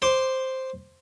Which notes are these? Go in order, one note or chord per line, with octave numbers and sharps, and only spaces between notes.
C5 C6 D6